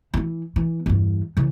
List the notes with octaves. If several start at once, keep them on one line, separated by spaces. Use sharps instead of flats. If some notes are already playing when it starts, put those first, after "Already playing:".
E3 F3
E3
E2 G2
C#3 E3